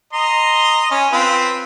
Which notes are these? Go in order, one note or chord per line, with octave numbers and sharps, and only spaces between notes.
D#5 A#5 C6
C#4
C4 F4 B4